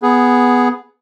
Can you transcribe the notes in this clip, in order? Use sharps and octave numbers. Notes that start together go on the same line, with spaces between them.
B3 G#4